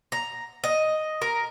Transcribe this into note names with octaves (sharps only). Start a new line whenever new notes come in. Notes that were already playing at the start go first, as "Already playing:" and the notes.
A#5
D#5
A#4